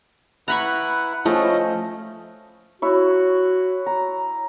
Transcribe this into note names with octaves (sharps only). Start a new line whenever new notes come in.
E4 B4 F#5 A#5 B5 C#6
F3 A3 C#4 D#5
E4 F#4 C#5
A#5